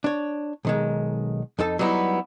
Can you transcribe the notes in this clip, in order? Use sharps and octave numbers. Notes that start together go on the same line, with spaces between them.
D4 C#5
B1 D#3 G#3
F2 D#4 A4 A5
F#3 G3 B3 D#4 E4